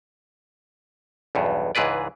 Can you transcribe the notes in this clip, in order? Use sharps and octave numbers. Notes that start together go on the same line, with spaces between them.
B1 E2 G2
C#2 G#2 E3 G#4 B4 D5